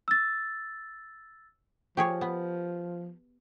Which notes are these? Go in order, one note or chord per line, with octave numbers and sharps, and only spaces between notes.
E6 A6
F3 G4 G#4 C#5
B3